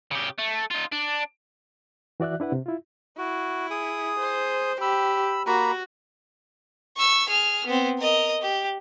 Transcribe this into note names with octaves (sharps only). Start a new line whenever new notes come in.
C#3 G4
A3
D#4 F4
D4
E3 F#4 D5 E5 F#6
D4 E4 B4 F#5
C3
E4 F4
E4 F#4
G#4 D#6
C5
G4 B5 E6
A#3 F#4 A#5 B5
C#6 E6
G#4 F6
B3 C4
A#4 D#5
G4